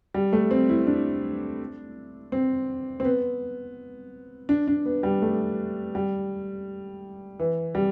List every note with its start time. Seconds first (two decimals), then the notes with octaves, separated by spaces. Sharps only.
0.14 G3
0.33 A3
0.51 C4
0.69 E4
0.87 D4
2.32 C4
3.00 C4
3.05 B3
4.49 D4
4.68 D4
4.86 B3
5.03 G3
5.22 A3
5.95 G3
7.39 E3
7.75 G3